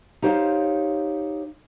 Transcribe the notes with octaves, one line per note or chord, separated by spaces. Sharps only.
D#4 G4 C5 C#5 F5